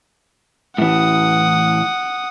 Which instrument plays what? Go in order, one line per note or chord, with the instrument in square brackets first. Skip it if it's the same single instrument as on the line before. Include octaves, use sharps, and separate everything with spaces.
[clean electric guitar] A2 E3 [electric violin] F#5 D#6